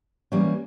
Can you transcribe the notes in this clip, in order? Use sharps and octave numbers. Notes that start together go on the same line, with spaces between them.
E3 G3 A#3 C#4